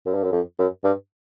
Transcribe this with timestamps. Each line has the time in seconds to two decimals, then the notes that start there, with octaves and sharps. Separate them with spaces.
0.06 F#2
0.14 G2
0.23 F#2
0.32 F2
0.59 F#2
0.84 G2